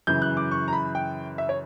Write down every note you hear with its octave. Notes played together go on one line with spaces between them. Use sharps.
F#2 C#3 E3 G6
F#6
D6
C#6
A#5
B5
G5
E5
C#5